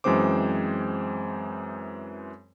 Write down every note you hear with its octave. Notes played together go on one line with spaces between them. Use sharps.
F#2 E3 G#3 C4 C5 D6